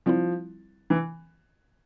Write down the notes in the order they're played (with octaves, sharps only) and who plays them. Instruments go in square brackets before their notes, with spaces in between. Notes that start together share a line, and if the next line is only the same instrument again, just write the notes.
[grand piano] F3 [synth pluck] G3 C4 E4
[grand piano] E3